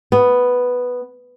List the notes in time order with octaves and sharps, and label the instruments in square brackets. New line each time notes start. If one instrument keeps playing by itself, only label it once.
[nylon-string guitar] B3